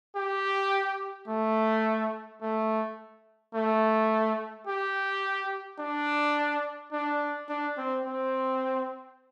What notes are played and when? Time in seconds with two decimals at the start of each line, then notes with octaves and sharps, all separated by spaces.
0.16 G4
1.28 A3
2.41 A3
3.54 A3
4.67 G4
5.79 D4
6.92 D4
7.49 D4
7.77 C4
8.05 C4